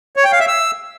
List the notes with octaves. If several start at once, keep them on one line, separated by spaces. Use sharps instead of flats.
C#5
G5
F5
E5
E6